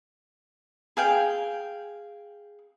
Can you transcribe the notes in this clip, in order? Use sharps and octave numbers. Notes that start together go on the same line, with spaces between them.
G#4 F5 G5